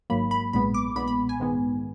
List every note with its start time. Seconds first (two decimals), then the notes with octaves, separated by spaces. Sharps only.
0.10 G#1 G#2 F#3 A#3 B5
0.31 B5
0.53 B1 A#2 G#3 B3 B5
0.74 D6
0.96 B1 A#2 G#3 B3 B5
1.08 B5
1.29 G#5
1.40 G#2 D#3 G#3 B3